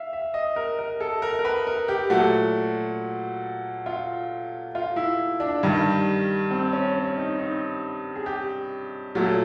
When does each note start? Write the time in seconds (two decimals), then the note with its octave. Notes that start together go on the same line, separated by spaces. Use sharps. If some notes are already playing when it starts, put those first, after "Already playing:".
Already playing: E5 F5
0.13 E5
0.34 D#5
0.56 A#4
0.79 A#4
1.00 A4
1.22 A#4
1.39 A#4
1.45 B4
1.67 A#4
1.88 G4
2.10 A#2 F#3 A3 F#4
3.86 F4
4.75 F4
4.96 E4
5.40 D4
5.63 G2 D#3 G3
6.51 C4
6.73 C#4
6.94 C#4
7.17 D#4
7.38 D#4
8.15 G#4
8.26 G4
9.15 A#2 F#3 A3